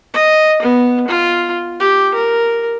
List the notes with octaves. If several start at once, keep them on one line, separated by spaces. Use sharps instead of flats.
D#5
B3
F4
G4
A#4